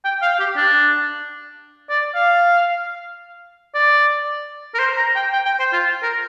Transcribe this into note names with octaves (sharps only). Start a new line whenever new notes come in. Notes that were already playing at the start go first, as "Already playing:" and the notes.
G5
F5
G4
D4
D5
F5
D5
A#4
C5
A#5
G5
G5
G5
C5
F4
A#4